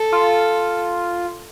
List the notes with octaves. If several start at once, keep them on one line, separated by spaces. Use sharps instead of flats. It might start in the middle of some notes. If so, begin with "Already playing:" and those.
Already playing: A4
F4